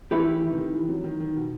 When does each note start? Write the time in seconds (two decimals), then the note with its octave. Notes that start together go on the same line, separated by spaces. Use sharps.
0.11 E3 A3 E4 G4 B4
0.27 E3
0.42 D#3
0.51 C3
0.58 D#3
0.74 E3
0.89 F#3
1.04 D#3
1.20 D#3
1.36 B2